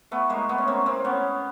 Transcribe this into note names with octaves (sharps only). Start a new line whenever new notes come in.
A3 B3
G#3 A#3
A3 B3
C#4
A#3 C4
A#3 C4
B3 C#4